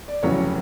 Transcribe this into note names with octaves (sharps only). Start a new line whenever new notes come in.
D5
F1 E2 C#3 F#3 C#5